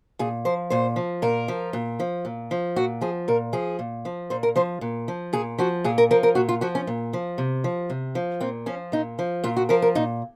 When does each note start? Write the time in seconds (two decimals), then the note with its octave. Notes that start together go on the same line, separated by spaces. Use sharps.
0.19 A#2 G#4
0.45 F3 C5
0.70 A#2 C5
0.96 F3
1.22 A#2 A#4
1.48 F3
1.73 A#2
2.00 F3
2.25 A#2
2.51 F3
2.76 A#2 F#4
3.01 F3 G#4
3.28 A#2 A#4
3.53 F3 G#4
3.79 A#2
4.05 F3
4.30 A#2 C5
4.43 A#4
4.56 F3 C5
4.81 A#2
5.08 F3
5.33 A#2 G#4
5.59 F3 F#4
5.84 A#2 G#4
5.98 A#4
6.11 F3 A#4
6.23 A#4
6.35 A#2 F#4
6.49 F4
6.61 F3 F#4
6.75 C#4
6.87 A#2
7.13 F3
7.38 C3
7.64 F3
7.90 C3
8.15 F3
8.41 A#2 C4
8.66 F3 C#4
8.92 A#2 D#4
9.19 F3
9.44 A#2 F4
9.57 F#4
9.69 F3 A#4
9.82 A#4
9.95 A#2 D#4